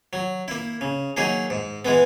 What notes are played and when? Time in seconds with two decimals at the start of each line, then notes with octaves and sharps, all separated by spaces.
0.13 F#3
0.48 A#3 E4
0.81 C#3
1.17 F#3 A#3 D#4 G#4
1.50 G#2
1.85 E3 G#3 B3